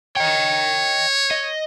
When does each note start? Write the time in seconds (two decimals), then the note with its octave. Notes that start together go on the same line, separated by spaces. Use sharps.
0.17 C#5 D#5 G5
1.31 D#5